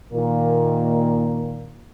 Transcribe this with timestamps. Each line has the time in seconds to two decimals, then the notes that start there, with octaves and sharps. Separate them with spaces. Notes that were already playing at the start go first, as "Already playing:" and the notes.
0.13 A#2 D#3 A#3